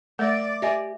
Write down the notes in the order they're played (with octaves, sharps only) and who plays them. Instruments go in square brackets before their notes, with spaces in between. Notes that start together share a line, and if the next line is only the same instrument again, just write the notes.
[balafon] A3 [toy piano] A#4 E5 [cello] D5
[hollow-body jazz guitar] G4 G#5 [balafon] D#5 [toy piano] E5